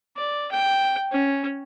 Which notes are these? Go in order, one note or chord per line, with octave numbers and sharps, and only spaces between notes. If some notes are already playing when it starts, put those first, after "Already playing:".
D5
G5
C#4